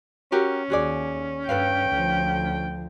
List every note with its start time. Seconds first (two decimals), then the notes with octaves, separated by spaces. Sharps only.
0.32 C#4 F#4 G4 A#4
0.70 D#2 F#4 G#4 D5
1.49 G2 A4 B4 F5 G5
1.90 D2 F3